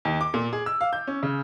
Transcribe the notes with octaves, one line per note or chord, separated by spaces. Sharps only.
D#2
D6
A#2
G#4
E6
F5
G6
C#4
C#3